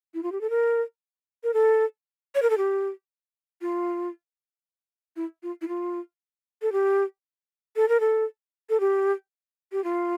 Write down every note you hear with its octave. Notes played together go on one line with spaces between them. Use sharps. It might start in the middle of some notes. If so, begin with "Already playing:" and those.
E4
F4
G4
A4
A#4
A#4
A4
C#5
A#4
A4
G4
F4
E4
F4
E4
F4
A4
G4
A4
A#4
A4
A4
G4
G4
F4